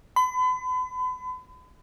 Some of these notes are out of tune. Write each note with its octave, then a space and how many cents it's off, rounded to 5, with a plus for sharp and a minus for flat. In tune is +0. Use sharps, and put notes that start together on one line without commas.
B5 +40